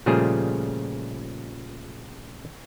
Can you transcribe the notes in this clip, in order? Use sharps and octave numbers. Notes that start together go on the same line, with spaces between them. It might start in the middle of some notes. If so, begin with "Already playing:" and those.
A#2 C#3 F3 G3 A3 G#4